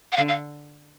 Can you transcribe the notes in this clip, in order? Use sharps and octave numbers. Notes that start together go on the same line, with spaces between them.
F#5
D3 F5
F5